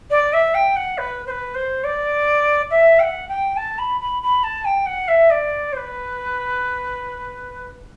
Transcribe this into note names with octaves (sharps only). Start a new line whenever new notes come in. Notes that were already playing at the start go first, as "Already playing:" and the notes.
D5
E5
G5
F#5
B4
C5
B4
C5
D5
E5
G5
F#5
G5
A5
B5
B5
B5
A5
G5
F#5
E5
D5
C5
B4